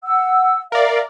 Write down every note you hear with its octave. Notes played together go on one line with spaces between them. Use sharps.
F#5 E6
A#4 D5 E5 F5